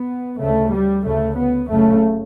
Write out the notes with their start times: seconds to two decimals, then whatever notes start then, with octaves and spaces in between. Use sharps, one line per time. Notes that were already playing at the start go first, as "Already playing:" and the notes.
Already playing: B3
0.40 D2 C#3 A3
0.73 G3
1.05 D2 C#3 A3
1.37 B3
1.69 F#1 F#2 C#3 A3